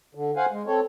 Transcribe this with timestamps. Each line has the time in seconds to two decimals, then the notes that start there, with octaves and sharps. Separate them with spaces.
0.15 D3
0.36 C5 F5 F#5 G#5
0.51 G#3
0.67 C4 A4 C#5